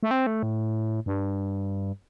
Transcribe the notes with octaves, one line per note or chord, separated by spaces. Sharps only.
A3
C4
A3
A2
G2